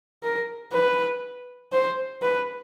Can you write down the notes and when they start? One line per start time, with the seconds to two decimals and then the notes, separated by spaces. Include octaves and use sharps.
0.23 A#4
0.73 B4
1.72 C5
2.22 B4